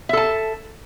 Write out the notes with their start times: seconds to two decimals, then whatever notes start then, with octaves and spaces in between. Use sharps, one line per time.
0.09 E5
0.13 A4
0.17 A5